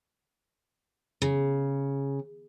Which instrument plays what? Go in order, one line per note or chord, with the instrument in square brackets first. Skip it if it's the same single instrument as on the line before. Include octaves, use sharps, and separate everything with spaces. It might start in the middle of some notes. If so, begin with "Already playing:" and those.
[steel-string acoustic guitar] C#3